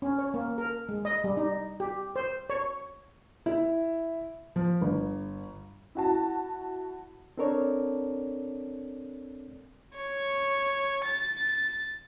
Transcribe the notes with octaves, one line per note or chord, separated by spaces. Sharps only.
C#4
C#5
A#3
A#4
G#3
D#5
G3
D#4
G4
C5
C#5
E4
F3
G1
E4 F#4 A5
C4 D4 A4 A#4 C#5 D5
C#5
A6